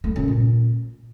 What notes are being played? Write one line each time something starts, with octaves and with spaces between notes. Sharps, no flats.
A3
C#3
A#2